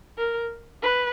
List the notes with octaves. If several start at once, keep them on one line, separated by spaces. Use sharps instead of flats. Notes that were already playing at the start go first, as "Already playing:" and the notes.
A#4
B4